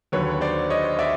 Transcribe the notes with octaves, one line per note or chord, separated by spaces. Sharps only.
D#2 D3 F#3 B4 C#5
C5 D5
C#5 D#5
D5 E5